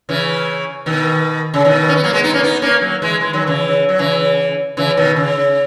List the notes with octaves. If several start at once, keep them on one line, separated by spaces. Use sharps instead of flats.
C#3 E3
B2 D#3
C#3
B2 D#3
C#4
B3
F#3 A#3
G#3 B3
B3 D#4
A#3 C#4
B3 D#4
A#3 C#4
F#3 A#3
E3 G#3
E3 G#3
D#3 F#3
C#3 E3
F#3
C#3 E3
C#3 E3
B2 D#3
C#3